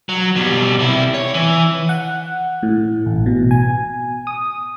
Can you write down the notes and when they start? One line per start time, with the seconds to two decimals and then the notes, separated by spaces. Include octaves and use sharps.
0.09 F#3
0.36 B2 G3
0.79 C3 E4
1.14 C#5
1.34 E3
1.89 F#5
2.63 A2
3.06 A1
3.26 B2
3.51 G#5
4.27 D#6